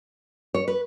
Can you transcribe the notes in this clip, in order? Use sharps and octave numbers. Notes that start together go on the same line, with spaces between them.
C#5
B4